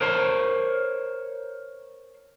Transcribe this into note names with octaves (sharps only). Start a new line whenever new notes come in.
A#4 C5 C#5 A5 C6